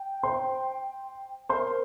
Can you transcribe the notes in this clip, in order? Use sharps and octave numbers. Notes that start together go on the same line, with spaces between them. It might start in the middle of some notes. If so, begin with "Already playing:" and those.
Already playing: G5
C5 C6
A#4 C5 C6